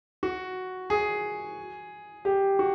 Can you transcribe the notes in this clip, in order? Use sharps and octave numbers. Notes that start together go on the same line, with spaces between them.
F#4
G#4
G4
F#4